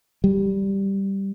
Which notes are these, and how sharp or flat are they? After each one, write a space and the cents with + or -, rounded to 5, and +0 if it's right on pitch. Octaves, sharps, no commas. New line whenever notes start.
G3 +0